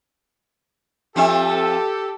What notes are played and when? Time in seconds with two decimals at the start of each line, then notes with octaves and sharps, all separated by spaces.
1.16 F3 C4 G4 A4 E5